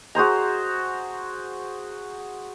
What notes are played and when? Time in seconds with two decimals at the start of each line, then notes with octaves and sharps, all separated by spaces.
0.15 F#4 G#4 C5 A#5